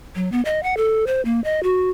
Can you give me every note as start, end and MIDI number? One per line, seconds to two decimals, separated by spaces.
0.16 0.30 54
0.32 0.41 59
0.45 0.62 75
0.63 0.77 78
0.77 1.05 69
1.07 1.21 72
1.25 1.40 58
1.44 1.63 75
1.63 1.90 66